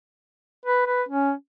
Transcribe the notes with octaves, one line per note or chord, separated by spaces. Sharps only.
B4
B4
C#4